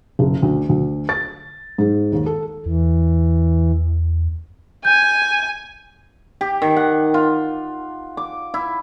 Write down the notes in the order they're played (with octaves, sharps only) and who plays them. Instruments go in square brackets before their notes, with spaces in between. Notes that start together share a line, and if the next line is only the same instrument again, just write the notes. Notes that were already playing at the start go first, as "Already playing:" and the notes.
[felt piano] F#1
D2
D2
A6
G#2
D#2
A4
[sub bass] E2 [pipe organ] E3
[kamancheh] G#5 [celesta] G6
[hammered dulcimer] G4
D#3
F#5
F4
D6
E4